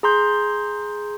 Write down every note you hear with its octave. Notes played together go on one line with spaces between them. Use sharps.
G#4 A#5 C6 G6